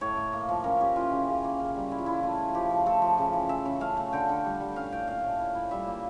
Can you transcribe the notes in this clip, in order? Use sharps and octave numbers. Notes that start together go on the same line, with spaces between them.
A2 C#5
A2
A#3
F3
C#4 A#4
C#4 G4
E3 F4
C#3
C#3
A#3
C#3
G3
E3 E4
F4
E3 E4
A3 F4
E4
F3 G4
F3
A3 A4
F3
C#3
E3
E3 E5
C#3
A3 F5
A3
D3 G5
D3
G3
G3
C#4 F5
A2 G5
A#2 F5
A3
E4
E4
G3 E5
A#3